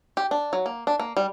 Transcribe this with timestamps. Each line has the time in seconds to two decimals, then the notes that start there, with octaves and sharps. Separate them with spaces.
0.17 G4
0.31 D4
0.53 F#3
0.66 A#3
0.87 D4
1.00 A#3
1.17 G3